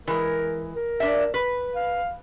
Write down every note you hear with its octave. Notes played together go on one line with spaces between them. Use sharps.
E3 G#3 A#4
A#4
D4 E5
B4
F5